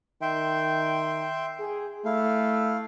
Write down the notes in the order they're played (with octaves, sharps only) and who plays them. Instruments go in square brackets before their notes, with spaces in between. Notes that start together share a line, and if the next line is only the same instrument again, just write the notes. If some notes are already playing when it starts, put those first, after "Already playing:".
[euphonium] D#3 [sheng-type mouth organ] E5 G5 C6
[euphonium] G#4
[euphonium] A3 [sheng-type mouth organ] E4 F5